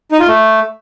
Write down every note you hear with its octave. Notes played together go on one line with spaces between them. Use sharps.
D#4
F4
A3